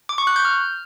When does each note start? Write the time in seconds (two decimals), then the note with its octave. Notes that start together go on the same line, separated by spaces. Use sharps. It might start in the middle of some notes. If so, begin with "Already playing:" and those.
0.09 D6
0.18 C#6
0.27 F#6
0.36 G6
0.45 F6